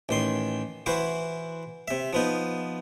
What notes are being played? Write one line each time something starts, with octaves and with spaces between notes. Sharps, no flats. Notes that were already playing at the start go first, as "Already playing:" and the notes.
A1 D#3 C6
E3 E4 F#4 C5
C3 E5
F3 B3 D#4